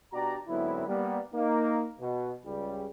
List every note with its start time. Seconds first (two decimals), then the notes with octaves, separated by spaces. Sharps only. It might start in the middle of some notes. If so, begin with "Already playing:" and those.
0.12 B2 D4 F#4 G4 D5 A#5
0.48 G#2 D3 F#3 B3 C4 E4
0.86 G3 A#3 B3
1.34 A#3 D#4
2.01 B2
2.45 C#2 C#3 G3